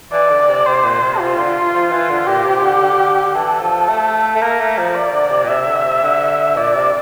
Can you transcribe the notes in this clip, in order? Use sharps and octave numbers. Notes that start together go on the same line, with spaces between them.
E3 D5
D3
C3
C3 C5
A#2
C3
C3 F4
D3
F3
E3
D3
A#2 G4
C3
D3
D3
E3 A4
F3
A3
A3
A#3 A#4
A3
F3
D5
D3
C3
A#2
C3 E5
D3
C3
D3
A#2 D5
C3